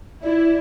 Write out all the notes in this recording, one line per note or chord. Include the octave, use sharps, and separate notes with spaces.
E4 D5